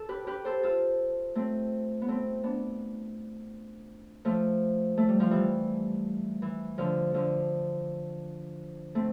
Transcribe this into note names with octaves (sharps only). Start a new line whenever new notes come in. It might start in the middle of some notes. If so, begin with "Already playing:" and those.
Already playing: A4
G4 B4
G4 B4
A4 C5
F4 A4
A3 C4
B3
A3 C4
B3 D4
F3 A3
A3
G3
F3
E3 G3
E3
D3 F3
D3 F3
A3 C4